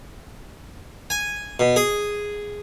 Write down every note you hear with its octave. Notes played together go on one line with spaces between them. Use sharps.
G#5
B2
G#4